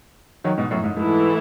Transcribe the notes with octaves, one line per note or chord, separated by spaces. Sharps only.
D#3 F#3
G#2 B2
F#2 A2
G#2
G#2 E3 A3 E4 A4